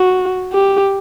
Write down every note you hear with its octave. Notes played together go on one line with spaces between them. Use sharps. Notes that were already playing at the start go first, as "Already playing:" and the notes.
Already playing: F#4
G4